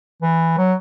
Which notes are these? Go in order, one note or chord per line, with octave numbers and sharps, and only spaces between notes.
E3
F#3